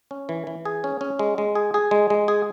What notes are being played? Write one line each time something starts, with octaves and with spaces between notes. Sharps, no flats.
C#4
E3
E3
G#4
C#4
C#4
G#3
G#3
G#4
G#4
G#3
G#3
G#4